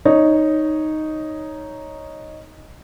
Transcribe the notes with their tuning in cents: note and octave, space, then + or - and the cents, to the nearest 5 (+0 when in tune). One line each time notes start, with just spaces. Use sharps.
D#4 +0 C#5 +0